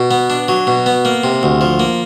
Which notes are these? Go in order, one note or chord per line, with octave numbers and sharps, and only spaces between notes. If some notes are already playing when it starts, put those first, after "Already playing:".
Already playing: B2
B3
D4
F#3
B2
B3
A#3
C3
D2
F3
A#3